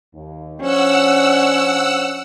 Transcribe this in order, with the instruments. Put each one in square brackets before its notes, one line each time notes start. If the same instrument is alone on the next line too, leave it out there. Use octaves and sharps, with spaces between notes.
[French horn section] D#2
[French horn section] F3 D4 C5 [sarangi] C#4 [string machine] F#5 E6